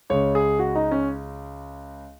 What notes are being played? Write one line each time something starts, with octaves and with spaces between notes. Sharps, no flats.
C#2 C#3 C#5
G#4
F#4
D#4
C#4